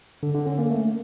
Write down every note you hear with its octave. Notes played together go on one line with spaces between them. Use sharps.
D3
D3
C#4
A#3
A3